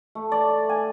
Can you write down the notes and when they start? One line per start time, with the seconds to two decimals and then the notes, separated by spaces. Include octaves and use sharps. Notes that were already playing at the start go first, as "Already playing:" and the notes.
0.15 A3
0.32 D5
0.69 G#5